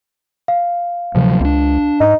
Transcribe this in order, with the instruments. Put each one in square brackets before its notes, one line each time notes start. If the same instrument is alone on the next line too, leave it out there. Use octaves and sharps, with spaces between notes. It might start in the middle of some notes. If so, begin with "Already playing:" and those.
[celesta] F5
[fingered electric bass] D2 C3 F#3 [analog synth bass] F3
[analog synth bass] C#2 [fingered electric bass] C4 D4
[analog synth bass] G#2 [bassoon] D#4